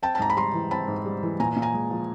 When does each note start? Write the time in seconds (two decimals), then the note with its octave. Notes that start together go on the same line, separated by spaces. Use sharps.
0.02 C4 G5 A5
0.15 A5
0.19 G#2 A#5
0.30 B5
0.37 G3 A#5 C6
0.54 E3
0.71 C4 A5 B5
0.88 G#2
1.06 G3
1.23 E3
1.40 A#2 G#5 A#5
1.56 A#2
1.62 G#5 A#5
1.74 G#3
1.91 F3